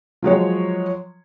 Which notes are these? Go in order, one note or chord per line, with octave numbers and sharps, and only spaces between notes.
F3 F#3 G#3 C#5